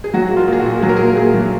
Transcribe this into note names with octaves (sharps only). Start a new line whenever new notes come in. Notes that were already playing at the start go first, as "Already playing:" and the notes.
G#4
F#3 F#4
A#2
F4
A#2
G#4
F#4
A#2
F#3 G#4
A#4
G#4
A#2
A#2 G#4
F#3